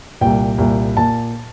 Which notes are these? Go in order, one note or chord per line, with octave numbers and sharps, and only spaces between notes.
C2 A#2 G5
C2 A#2
A#2 A5